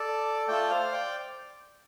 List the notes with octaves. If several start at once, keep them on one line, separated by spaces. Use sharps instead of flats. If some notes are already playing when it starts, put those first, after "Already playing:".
Already playing: A4 D5
A3 F4 A4 D5 G5
C5 F5
D5 G5